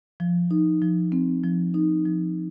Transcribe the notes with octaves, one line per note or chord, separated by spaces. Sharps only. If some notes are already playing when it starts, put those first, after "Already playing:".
F3
D#4
F3
C4
F3
D#4
F3